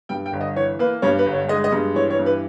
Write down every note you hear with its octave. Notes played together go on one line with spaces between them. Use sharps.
G2 G5
G5
G1
D#5
E3 C#5
A#3 B4
G2 C#5
B4
G1
C#5
G#3 D#5
D#5
G2
E3 C#5
C#5
G2
B4